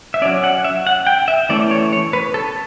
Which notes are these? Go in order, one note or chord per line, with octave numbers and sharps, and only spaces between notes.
E5
F#3 C#4 D5
F#5
E5
F#5
G5
E5
E3 A3 C#4 D5
C#5
C#5
B4
A4